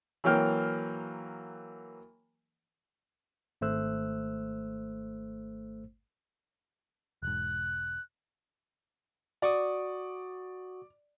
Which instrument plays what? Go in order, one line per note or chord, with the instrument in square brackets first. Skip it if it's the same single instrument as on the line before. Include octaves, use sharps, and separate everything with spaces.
[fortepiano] E3 F#3 A#3 G5 F6
[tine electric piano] G#1 A3 C5 E6 F#6
[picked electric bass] E1 G#2 [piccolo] F#6
[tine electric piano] F#4 C#6 D#6 [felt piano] D5